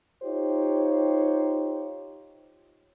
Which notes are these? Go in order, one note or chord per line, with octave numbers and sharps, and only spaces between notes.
D#4 F4 G4 C5 C#5